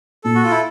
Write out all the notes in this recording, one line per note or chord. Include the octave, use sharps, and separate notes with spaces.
A#2 A4
F#4
F4
E4